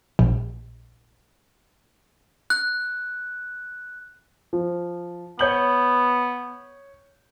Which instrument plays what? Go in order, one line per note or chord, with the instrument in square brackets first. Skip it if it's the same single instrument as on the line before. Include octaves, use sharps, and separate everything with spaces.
[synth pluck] A#1
[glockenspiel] F#6
[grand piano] F3
[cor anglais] B3 [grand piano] C#5 G6 F#7